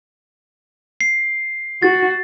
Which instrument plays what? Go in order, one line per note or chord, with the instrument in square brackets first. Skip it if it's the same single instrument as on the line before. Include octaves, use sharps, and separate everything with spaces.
[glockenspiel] C7
[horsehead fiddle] F#4 [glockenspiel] A6